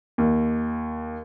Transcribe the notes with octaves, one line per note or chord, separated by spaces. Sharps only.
D#2